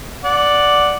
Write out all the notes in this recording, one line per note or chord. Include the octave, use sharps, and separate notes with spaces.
D5 F#5